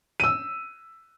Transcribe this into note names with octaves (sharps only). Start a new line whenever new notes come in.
E6 D#7